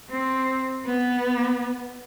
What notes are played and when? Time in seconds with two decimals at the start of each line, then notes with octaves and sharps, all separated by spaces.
0.10 C4
0.86 B3